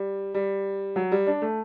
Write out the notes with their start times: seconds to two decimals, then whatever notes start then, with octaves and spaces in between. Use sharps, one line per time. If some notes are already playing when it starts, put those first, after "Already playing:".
Already playing: G3
0.34 G3
0.96 F#3
1.12 G3
1.27 D4
1.42 A3